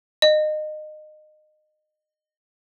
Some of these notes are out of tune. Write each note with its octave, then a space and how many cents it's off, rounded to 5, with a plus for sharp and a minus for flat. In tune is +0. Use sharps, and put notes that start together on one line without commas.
D#5 -25